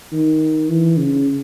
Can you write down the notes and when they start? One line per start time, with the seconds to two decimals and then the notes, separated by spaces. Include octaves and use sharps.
0.13 D#3
0.69 E3
0.97 C#3